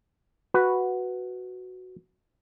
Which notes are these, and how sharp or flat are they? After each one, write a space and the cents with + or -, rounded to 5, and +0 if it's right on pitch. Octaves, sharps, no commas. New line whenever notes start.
F#4 +0 B4 +0